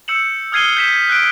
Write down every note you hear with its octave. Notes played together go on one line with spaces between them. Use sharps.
E6 G6 C#7 E7 F#7
D#6 F6 G#6 C7 D#7 G7
G6 B6 E7
G#6 B6
F#6 D7